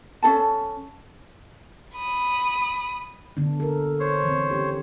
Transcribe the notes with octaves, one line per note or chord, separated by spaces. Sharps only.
C#4 G#4 A4 A5
B5 D#6
D3 B3 D4
A4 A#4
C5 C#5
E3 C4
C#4 G4